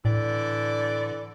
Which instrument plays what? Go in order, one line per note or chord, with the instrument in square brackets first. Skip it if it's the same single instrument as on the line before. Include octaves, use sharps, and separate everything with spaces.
[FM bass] A2 [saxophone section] D3 E3 D5